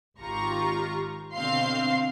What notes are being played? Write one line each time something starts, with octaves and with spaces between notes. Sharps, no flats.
G#1 F4 G4 A#5 C#6
B2 D3 C4 F5 C6 C7